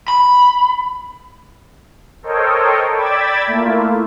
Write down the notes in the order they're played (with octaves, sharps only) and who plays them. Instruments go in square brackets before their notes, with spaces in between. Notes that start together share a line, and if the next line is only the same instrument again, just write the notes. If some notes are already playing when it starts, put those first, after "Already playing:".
[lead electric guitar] B5
[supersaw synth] A4 A#4 C5 C#5 D#5 G5
D5 G5 B5 E6 G#6 A6
A3 A#3 E4 F4